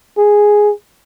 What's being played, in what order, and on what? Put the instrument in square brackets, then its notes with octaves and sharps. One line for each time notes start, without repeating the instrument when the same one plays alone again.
[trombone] G#4